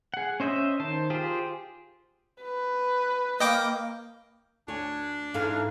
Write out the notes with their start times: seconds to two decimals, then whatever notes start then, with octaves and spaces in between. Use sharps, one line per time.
0.14 G#4 F#5
0.40 C#4 C5 D#5 E5 G6
0.80 D#3 C5 A5
1.10 F4 G4 G#4 C5
2.43 B4
3.40 A#3 D#5 G5 D6
4.68 D2 D4 C#5 G#5
5.34 G#2 E3 A4 F5 G#5 A5